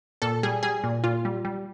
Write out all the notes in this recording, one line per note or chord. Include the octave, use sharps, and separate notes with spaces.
A#2 A4
G3 G#4
G3 G#4
A#2
A#2 F4
G3
G3